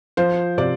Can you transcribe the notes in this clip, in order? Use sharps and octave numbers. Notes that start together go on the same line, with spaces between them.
F3 C5
C3 D5